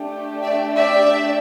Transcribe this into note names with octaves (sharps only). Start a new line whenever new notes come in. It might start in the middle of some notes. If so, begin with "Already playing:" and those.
Already playing: A3 D4 G4
D5 E5
D5 E5